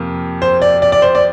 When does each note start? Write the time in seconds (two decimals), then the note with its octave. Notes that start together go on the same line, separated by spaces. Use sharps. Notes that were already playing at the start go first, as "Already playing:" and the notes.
Already playing: F2 C3 A#3
0.42 C5
0.62 D5
0.82 D5
0.92 D5
1.02 C5
1.15 D5